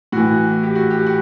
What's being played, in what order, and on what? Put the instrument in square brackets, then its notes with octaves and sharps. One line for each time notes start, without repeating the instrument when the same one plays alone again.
[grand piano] A2 E3 F#4
G4
F#4
G4
F#4